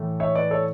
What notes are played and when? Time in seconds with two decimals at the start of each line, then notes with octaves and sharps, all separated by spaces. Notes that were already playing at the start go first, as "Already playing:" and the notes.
Already playing: A2 E3 A3
0.20 C#5 E5
0.35 B4 D5
0.51 A4 C#5